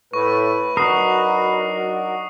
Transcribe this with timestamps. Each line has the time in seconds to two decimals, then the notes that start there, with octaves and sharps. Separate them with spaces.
0.13 A2 B4 C#6
0.77 F#3 D4 D#4 F#4 A#4 D#6 C7